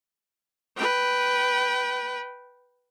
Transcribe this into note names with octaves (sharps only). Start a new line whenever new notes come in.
B4 G5